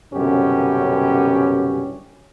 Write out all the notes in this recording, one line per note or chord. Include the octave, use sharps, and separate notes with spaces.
C2 F#2 B2 D3 C#4 G4